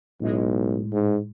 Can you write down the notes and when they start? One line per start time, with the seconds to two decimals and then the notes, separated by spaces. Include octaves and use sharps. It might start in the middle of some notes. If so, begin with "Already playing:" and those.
0.21 B1 A2 G#3
0.92 G#2